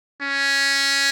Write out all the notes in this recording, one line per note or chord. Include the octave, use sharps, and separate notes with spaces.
C#4